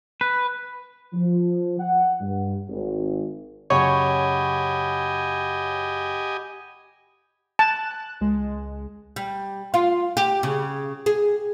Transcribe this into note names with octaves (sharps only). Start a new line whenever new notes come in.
B4
F3
F#5
G2
G#1
F#2 C#3 G4 C#5 D#5 F#5 G#5 B5
A5 F#6
C#2 G#3
G3
F4
G4
C#3
G#4